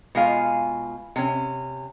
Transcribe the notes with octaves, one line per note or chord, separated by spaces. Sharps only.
B2 G#3 F4 F5 G#5
C3 C#4